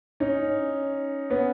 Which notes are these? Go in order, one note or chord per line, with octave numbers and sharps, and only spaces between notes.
C#4 D#4
B3 C#4